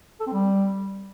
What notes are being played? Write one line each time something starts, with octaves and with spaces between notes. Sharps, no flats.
A4
C4
G3